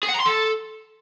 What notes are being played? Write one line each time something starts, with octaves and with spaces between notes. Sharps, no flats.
G#4
F#5
A#5
C6
A4